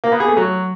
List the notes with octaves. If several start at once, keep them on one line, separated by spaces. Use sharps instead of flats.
A#3
B3
G#4
A3
F#3